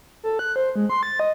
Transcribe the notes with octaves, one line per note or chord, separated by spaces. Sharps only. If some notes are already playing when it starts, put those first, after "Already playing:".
A4
F#6
C5
G#3
C6
A6
D#5